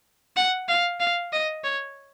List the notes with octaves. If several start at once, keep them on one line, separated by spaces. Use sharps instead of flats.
F#5
F5
F5
D#5
C#5